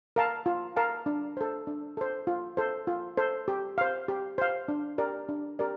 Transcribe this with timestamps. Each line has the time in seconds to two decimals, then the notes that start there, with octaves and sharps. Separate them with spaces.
0.16 A#4 F5 A5
0.46 F4
0.76 A#4 F5 A5
1.06 D4
1.37 A4 C5
1.67 D4
1.97 A4 C5
2.27 F4
2.57 A4 C5
2.87 F4
3.17 A4 C5
3.48 G4
3.78 C5 F5
4.08 G4
4.38 C5 F5
4.68 D4
4.98 G4 A#4 D5
5.29 D4
5.59 G4 A#4 D5